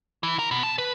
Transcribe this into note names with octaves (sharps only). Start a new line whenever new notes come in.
E3
A#4
B2
A5
B4